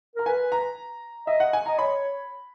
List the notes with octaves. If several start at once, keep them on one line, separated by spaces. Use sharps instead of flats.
A#4 A#5
B4 G#5
A#5
D#5 E5
F#5
G#5
D#5 A#5
C#5 B5